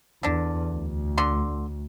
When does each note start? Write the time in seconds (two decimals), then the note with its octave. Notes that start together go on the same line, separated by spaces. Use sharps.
0.23 E2 D3 D4
0.73 D2
1.18 D3 C6